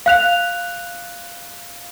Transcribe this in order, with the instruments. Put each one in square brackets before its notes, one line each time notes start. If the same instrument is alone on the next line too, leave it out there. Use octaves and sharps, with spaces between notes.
[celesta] F5 F#6 F7